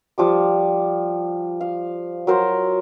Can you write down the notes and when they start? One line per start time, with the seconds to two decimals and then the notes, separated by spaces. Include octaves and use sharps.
0.18 F3 G3 D6
1.60 F5
2.27 F#3 A#4 C5